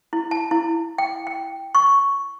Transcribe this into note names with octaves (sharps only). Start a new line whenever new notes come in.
E4
A5
E4
G5
G5
C#6